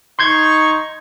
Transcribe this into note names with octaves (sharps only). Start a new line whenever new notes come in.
D#4 C6 C#6 G6 G#6